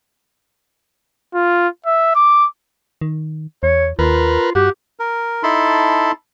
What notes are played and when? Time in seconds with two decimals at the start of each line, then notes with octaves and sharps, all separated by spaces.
1.34 F4
1.86 E5
2.15 D6
3.01 D#3
3.63 E2 C#5
3.99 D#2 F4 A#4 B4
4.55 G2 F#4 G4
5.00 A#4
5.43 D#4 E4 A4 A5 B5 C6